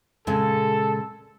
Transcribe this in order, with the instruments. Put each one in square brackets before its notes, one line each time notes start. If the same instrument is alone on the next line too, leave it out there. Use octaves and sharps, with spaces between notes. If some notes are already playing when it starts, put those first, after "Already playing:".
[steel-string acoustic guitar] A#2 C#3 G#3 [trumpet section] A4